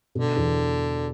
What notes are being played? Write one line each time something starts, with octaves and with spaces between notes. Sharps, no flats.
B2 D3
E2